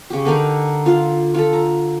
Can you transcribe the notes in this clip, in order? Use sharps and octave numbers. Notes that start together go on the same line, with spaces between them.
C#3 G4
D3 D4 D#4 A#4
F4 F5
F4 A4
A#5